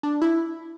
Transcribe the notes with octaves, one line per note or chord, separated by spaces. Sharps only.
D4
E4